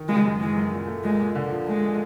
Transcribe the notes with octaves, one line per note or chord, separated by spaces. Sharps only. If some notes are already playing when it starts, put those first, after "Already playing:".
Already playing: D#3
C#3 G#3
F#2
E3 G#3
F#2
A#2
A3
A#2 G#3
A#2
D3
F3
G#3 A3
F3